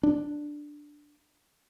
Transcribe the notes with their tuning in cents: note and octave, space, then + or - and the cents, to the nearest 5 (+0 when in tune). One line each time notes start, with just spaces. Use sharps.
D4 +5